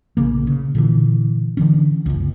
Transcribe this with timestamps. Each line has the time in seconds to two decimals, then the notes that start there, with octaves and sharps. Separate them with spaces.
0.17 A#1 C#3 A#3
0.47 C#3
0.75 A#2 D3 E3
1.57 D3 E3 C#4
2.06 F#1 C#2